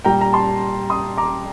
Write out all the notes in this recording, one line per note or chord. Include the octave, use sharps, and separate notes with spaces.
A#2 G3 G5 A#5
A#5
A5 C6
C6 D#6
A#5 D6